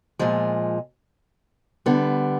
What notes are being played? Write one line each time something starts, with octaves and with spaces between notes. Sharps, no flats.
A#2 F3 G#3
D3 G3 B3